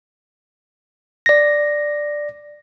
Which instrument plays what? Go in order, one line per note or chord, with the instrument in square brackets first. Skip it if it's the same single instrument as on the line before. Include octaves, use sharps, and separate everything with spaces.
[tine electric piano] D5 A#6